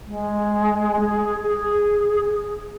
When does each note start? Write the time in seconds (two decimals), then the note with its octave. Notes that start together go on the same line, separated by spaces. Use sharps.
0.07 G#3
1.00 G#4
1.47 G#4